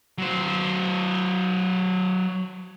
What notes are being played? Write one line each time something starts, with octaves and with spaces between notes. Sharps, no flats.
F#3 C5